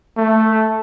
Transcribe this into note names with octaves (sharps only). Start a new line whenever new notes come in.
A3